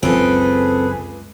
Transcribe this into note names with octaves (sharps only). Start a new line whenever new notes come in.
F#1 C#2 F#2 G#3 C4 G#4 A4 B4